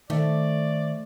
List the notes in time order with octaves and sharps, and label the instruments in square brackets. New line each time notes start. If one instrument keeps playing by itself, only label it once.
[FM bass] D#3 [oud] A3 [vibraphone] C5 E5 [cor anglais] D5